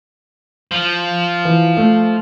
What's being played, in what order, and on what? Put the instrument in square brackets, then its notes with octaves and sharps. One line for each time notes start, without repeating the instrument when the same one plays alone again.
[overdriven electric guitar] F3
[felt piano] E3
A3